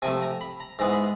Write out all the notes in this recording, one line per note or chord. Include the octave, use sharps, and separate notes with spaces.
C3 F3 A3 G#5
A#5
B5
A#5
G#2 E3 G#3 B3 A#5
B5